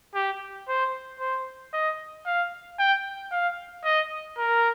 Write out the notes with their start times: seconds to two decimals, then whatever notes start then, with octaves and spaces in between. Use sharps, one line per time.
0.15 G4
0.68 C5
1.20 C5
1.73 D#5
2.26 F5
2.79 G5
3.32 F5
3.84 D#5
4.38 A#4